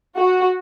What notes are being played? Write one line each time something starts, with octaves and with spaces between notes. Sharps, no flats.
F#4